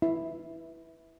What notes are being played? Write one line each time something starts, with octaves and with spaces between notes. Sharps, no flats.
E4